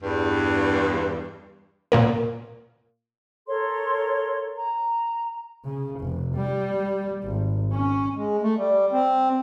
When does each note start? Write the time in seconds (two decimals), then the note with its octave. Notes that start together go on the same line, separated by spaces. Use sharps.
0.02 E2 G2
1.92 A#2 A#3 A#4
3.47 A4 A#4 C#5 C6
4.55 A#5
5.65 C#3
6.01 F1
6.35 G3
7.24 G#1
7.72 C#4
8.14 G#3
8.42 A3
8.57 G3
8.92 C4